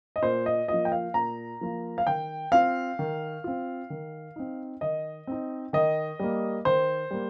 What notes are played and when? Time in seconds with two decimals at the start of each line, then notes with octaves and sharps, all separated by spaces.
0.16 D#5
0.22 A#2 C5
0.46 D#5
0.68 F3 A#3 F4 D#5
0.85 G5
0.92 F5
1.14 A#2 A#5
1.61 F3 A#3 F4
1.98 F5
2.07 D#3 G5
2.52 C4 F4 F5
2.99 D#3
3.44 C4 F4
3.90 D#3
4.36 C4 D#4
4.81 D#3 D#5
5.27 C4 D#4
5.73 D#3 D#5
6.19 G3 A#3
6.65 D#3 C5
7.11 G3 A#3